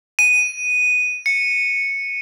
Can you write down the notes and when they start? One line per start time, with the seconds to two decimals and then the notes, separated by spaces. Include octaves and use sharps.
0.19 D#7
1.26 C#7